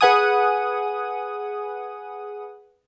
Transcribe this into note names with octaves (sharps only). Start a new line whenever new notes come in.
G#4 B4 F#5 G#5 D#6